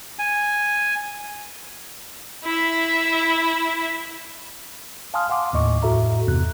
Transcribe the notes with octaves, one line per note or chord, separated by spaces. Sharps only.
G#5
E4 E5
F5 G#5 A5 C6 D#6 F6
F5 F#5 C6 D6
D#2 A2 D#5 C#6 D6
F2 A2 F#4 A4 E5 A#5
E2 G2 C3 F#6